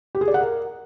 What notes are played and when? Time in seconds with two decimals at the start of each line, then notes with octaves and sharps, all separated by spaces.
0.15 G4
0.21 G#4
0.28 D5
0.34 F#5
0.41 A#4